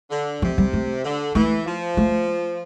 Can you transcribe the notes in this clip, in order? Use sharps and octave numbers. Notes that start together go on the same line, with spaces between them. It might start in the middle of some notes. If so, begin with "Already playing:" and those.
D3
C3 F3
G3
A3
D3
E3 A3
F3
A3